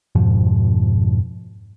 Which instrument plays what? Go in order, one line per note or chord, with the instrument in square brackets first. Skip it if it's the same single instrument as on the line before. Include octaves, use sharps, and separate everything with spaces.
[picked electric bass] F2 G#2 B2 F3